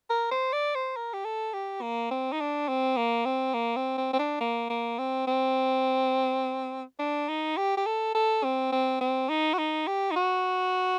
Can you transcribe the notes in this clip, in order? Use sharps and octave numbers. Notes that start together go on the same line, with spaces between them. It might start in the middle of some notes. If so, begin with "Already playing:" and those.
A#4
C5
D5
C5
A#4
G4
A4
G4
A#3
C4
D#4
D4
C4
A#3
C4
A#3
C4
C4
C4
D4
A#3
A#3
C4
C4
D4
D#4
G4
G4
A4
A4
C4
C4
C4
D#4
F#4
D#4
G4
D#4
F#4